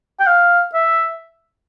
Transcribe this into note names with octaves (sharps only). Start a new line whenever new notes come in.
G5
F5
E5